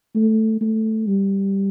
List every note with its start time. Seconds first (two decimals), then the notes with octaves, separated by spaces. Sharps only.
0.15 A3
0.61 A3
1.07 G3